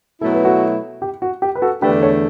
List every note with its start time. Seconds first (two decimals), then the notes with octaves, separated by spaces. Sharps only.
0.21 B2 F#3 A3 E4 A4
0.33 B4
0.45 F#4 A4
1.02 G4
1.22 F#4
1.42 G4
1.55 B4
1.62 F#4 A4
1.82 E2 D3 A3 D4 G4 B4
2.02 A4 C#5